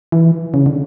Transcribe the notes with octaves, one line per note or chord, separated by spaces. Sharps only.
E3
C#3
D3